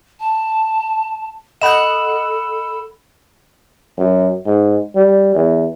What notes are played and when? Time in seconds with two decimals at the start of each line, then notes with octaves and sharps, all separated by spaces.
0.20 A5
1.62 A4 D#5 F#5 B5 F#6 E7
3.98 F#2
4.46 G#2
4.95 G3
5.35 E2